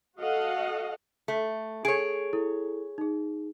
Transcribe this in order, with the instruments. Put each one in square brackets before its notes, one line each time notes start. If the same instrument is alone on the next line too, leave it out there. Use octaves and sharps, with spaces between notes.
[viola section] F#4 A4 D#5 F5 F#5
[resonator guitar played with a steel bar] A3
[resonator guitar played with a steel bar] G#4 C#5 [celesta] A4 D7
[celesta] E4 A4
D#4 G#4